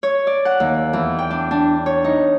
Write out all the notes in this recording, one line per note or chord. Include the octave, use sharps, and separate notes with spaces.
C#5
D5
F#5
D#2
E2
G5
D4
D4
C#5
D#4